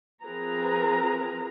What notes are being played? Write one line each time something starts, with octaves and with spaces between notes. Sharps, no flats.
F3 C4 G#4 A#4 B4 A#5